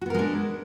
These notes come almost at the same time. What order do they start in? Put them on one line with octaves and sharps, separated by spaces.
F#4 B3 A#4 G#3 D4